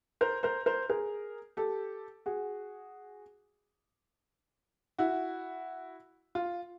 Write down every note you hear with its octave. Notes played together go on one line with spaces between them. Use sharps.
A#4 C5
A#4 C5
A#4 C5
G#4 A#4
G4 A4
F#4 G#4
E4 F#4
F4